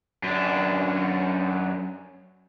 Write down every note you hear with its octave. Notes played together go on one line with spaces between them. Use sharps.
F#2 D4